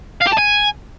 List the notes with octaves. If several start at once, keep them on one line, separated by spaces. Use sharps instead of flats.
F5
G4
A5
G#5